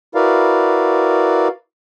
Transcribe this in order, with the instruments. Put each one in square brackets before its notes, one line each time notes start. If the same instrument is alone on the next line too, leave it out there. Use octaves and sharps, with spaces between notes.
[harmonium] E4 F#4 A#4 B4 D5 F5